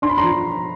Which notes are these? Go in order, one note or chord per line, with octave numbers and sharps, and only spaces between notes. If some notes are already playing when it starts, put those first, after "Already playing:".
D4 C6
B5
A#5 C6
F3